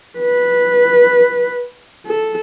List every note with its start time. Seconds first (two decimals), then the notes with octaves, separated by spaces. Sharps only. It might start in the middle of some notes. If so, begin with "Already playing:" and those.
0.18 B4
2.06 A4